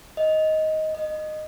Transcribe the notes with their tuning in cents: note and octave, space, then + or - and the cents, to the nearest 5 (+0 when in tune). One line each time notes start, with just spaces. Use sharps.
D#5 +10
D#5 -15